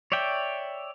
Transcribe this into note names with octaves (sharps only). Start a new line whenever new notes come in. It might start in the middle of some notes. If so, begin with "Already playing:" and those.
C#5 D5 E5 G5